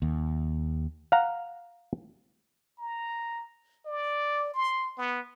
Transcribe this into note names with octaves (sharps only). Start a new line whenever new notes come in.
D#2
F5 F#5 A#5
A#5
D5
C6
B3